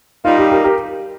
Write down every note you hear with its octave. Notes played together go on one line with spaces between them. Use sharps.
G3 A#3 D#4 F4
G4
G4 A#4
G4 A#4